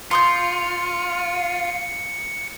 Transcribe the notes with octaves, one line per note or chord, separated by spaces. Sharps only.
F4 C6 D#6 G6 C#7